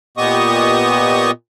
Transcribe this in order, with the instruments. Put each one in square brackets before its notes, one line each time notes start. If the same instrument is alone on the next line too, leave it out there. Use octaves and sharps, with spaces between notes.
[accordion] A#2 B3 G4 D#5 C#6 D#6